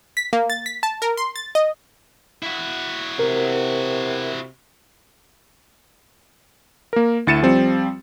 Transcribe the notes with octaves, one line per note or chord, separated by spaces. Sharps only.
B6
A#3
A6
B6
A5
A#4
C6
A6
D#5
E4 F#4
C3 A#4
A#3 A#4
D2 E4 A6 C#7 D#7 E7
F3 G3 C4